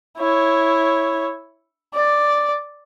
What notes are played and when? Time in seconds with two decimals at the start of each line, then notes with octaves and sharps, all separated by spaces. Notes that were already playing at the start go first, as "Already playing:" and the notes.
0.18 E4 C#5
1.94 D5